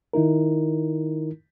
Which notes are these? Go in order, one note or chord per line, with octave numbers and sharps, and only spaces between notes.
D#3 D#4 E4 A#4